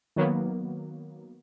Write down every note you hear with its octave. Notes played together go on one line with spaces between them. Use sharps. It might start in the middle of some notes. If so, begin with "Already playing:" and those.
D#3 F#3 A#3 B3